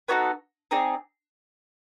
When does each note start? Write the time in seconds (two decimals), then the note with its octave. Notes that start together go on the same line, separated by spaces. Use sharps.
0.08 B3 D#4 F#4 A4 C#5
0.71 C4 D#4 G#4 D5